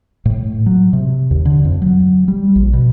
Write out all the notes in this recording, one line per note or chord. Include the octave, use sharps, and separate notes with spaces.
A2
F#3
C3
D#2
D3
F2
F#3
G3
A#1
B2